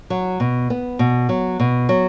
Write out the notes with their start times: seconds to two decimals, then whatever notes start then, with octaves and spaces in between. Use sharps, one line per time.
0.10 F#3
0.40 B2
0.70 B3
0.99 B2
1.29 F#3
1.60 B2
1.89 F#3